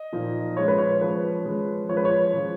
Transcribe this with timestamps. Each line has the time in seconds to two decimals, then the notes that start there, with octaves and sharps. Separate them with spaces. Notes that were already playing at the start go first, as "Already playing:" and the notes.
Already playing: D#5
0.13 A#2 F3 A#3 D#4
0.57 F3 G#3 C#4 C#5
0.68 B4
0.78 C#5
1.01 F3 G#3 C#4 B4
1.45 F3 G#3 C#4
1.89 F3 G#3 C#4 C#5
1.97 B4
2.05 C#5
2.34 F3 G#3 C#4